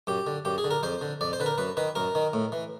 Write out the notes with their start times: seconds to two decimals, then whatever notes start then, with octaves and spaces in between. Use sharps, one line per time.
0.07 F#2 G4
0.27 D3
0.45 F#2 G4
0.58 G#4
0.64 D3
0.71 A#4
0.83 F2 C5
1.01 D3
1.21 F2 D5
1.33 C5
1.40 D3 B4
1.46 A#4
1.58 F#2 B4
1.77 D#3 B4
1.95 F#2 A#4
2.15 D#3
2.33 A2
2.52 E3